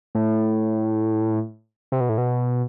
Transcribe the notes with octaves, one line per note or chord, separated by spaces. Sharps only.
A2
C3
B2
A2
B2